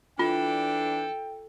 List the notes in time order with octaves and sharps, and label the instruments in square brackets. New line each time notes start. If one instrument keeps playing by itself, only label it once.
[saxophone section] E3 D4 [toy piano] F4 [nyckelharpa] A4 [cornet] G5